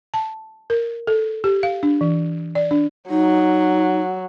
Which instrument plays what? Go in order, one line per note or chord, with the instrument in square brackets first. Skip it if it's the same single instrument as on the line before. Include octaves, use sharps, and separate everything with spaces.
[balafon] A5
A#4
A4
G4
F5
D4
E3
D5
D4
[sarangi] F#3 [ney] D#4